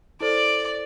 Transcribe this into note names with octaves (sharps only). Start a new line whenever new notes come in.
E4 A4 C5 D5